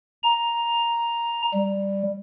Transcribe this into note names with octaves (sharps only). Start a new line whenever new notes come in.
A#5
G3